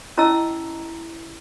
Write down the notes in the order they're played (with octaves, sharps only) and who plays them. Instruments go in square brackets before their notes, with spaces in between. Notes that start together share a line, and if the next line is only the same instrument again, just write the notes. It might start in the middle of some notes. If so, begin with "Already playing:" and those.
[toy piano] C#4 E4 D#5 A5 A#5 E6